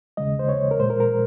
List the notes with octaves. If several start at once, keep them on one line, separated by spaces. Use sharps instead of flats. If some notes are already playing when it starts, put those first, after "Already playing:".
D#2 C#3 G#3 D#5
C5
C#5
A#4
A#2 G#3 C5
A#4
A#4